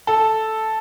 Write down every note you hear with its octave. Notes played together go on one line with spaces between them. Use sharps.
A4